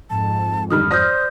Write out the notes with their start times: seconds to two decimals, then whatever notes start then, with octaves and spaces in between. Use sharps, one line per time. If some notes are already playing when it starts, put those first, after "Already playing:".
0.10 F2 G#2 A5
0.70 D3 D#3 G3 D#4 D#6 F6
0.91 C5 D5 D#6 F6 G6 A#6